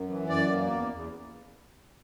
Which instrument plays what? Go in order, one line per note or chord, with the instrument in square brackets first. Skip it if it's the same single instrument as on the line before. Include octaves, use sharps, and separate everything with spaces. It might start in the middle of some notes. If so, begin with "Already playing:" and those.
Already playing: [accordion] F#2
E3
F#2 D5
A#3
E2
E2